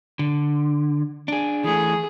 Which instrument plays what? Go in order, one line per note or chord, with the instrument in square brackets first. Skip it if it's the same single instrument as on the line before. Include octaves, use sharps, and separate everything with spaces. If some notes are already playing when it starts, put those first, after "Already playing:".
[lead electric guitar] D3
D4 G#4
[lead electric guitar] E3 A3 [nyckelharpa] G#4